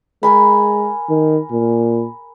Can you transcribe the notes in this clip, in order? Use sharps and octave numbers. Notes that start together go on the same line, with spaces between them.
G#3 A#4 G#5 B5
D#3
A#2